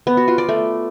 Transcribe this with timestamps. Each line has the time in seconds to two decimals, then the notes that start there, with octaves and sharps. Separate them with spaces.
0.07 B3
0.17 F#4
0.28 F4
0.38 D5
0.49 A3